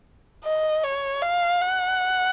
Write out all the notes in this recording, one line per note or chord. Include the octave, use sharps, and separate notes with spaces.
D#5
C#5
F5
F#5